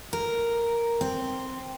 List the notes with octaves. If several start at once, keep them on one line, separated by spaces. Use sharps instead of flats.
A#4
C4